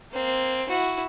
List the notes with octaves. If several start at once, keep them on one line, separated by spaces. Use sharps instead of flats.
A#3 C4
E4 F#4